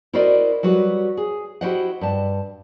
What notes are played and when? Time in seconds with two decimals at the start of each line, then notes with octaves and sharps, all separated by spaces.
0.13 E4 F#4 A#4 C5 D5 D#5
0.63 F#3 G3 F#4 B4
1.17 G#4
1.61 E4 F#4 G4 C5 D#5 F#5
2.01 G2 A5